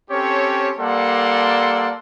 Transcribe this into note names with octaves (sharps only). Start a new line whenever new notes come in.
C4 C#4 G4 A4 C#5
G3 A#3 A4 D5 F#5 C6